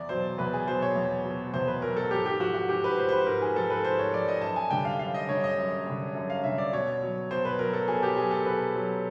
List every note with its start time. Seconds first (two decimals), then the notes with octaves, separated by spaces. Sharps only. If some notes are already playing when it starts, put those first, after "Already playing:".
Already playing: E2 D5
0.09 B2 F#3 C5
0.38 E2 B4
0.53 G#4
0.67 B2 F#3 C5
0.82 C#5
0.95 E2
1.25 B2 F#3
1.54 E2 C5
1.68 B4
1.82 B2 F#3 A#4
1.96 A4
2.11 G#2 G4
2.26 G4
2.40 F3 F#4
2.54 F#4
2.69 G#2 G4
2.84 B4
2.98 F3 C5
3.09 C5
3.12 B4
3.26 G#2 A#4
3.42 G#4
3.56 F3 A4
3.70 B4
3.85 G#2 C5
3.99 C#5
4.13 F3 D5
4.28 D#5
4.42 F#2 A5
4.56 G#5
4.70 D3 G3 G5
4.85 F5
4.99 F#2 F5
5.14 D#5
5.29 D3 G3 C#5
5.44 D#5
5.58 F#2
5.86 D3 G3
6.15 F#2
6.30 F5
6.44 D3 G3 E5
6.58 D5
6.73 B2 C#5
7.02 F#3
7.31 B2 C5
7.45 B4
7.59 F#3 A#4
7.73 A4
7.88 B2 G#4
8.03 G4
8.17 F#3 G#4
8.31 A4
8.46 B2 B4
8.76 F#3